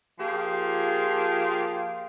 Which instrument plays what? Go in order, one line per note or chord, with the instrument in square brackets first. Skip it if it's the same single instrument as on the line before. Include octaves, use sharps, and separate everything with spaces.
[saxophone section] F3 A#3 F4 G4 G#4